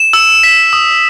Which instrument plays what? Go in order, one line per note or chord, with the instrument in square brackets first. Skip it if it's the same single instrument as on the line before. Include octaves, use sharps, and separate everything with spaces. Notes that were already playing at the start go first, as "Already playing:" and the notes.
Already playing: [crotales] E7
E6
B6
D#6